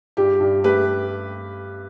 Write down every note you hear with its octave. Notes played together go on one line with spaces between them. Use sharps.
G2 G4
G2
A3 G4 B4